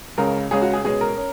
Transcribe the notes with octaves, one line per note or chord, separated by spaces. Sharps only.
C#2 C#3 G#3 C#4 A#4
C#2 C#3 G#3 C#4 G#4
F#4
G#4
B2 G#3 C#4 G#4
A#4
C#4